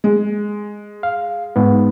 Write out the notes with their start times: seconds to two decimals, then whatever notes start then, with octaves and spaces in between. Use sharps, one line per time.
0.04 G#3
1.03 F5
1.56 G#2 B3